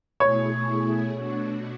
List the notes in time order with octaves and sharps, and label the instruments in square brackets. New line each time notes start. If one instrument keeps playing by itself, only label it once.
[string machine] B2 A3 E4 G#4 [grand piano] C#5
[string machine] B2 A3 D4 F#4